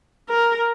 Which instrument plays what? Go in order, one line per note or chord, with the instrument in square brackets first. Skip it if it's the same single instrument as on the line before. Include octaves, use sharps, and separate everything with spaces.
[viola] A#4